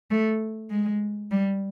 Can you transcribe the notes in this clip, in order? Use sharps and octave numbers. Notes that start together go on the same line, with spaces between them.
A3
G#3
G3